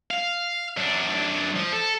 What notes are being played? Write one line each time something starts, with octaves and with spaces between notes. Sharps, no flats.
F5
F#2 D4
F3
A4